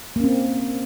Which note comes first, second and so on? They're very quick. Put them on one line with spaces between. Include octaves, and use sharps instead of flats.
A#3 C#4 C4